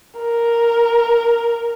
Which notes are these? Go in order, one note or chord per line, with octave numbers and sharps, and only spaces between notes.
A#4